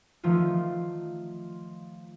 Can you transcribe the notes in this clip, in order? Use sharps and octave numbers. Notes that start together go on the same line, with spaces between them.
D#3 F3 A3 F4